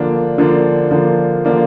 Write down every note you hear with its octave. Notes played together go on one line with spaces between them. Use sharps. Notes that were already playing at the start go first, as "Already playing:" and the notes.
Already playing: D3 F3 A#3 D4
D3 F3 A#3 D4
D3 F3 A#3 D4
D3 F3 A#3 D4